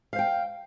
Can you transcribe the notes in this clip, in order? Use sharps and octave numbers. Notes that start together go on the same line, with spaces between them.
C5 F5 G5